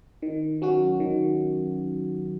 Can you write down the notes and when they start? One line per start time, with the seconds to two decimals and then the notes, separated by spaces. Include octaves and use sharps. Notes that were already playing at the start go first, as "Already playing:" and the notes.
0.22 D#3
0.62 F#3 C#4 F#4
1.00 D#3